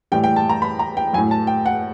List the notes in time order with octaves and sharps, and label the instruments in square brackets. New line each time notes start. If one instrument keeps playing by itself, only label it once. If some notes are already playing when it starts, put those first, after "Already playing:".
[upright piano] A2 E3 G3 G5
G5
A5
A#5
B5
A#5
G5
F#3 G#5
A2
A5
G5
F#5